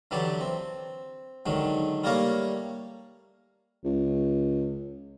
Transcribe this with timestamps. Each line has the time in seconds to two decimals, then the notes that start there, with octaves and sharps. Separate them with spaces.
0.11 D3 E3 F#3 G4 D5
0.41 C4
1.46 G#2 D3 D#3 F#3
2.04 G3 A3 A#3 A#4 C#5 F5
3.84 C#2